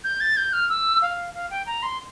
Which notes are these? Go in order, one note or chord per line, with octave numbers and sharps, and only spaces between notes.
G6
A6
G6
F6
E6
F5
F5
G5
A#5
C6